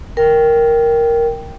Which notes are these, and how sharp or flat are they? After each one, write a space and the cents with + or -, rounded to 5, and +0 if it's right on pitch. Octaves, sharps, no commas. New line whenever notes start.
A#4 +0 G5 -5